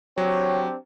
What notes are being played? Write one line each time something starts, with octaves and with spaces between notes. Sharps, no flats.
F#3 C4 D4 G4 C#5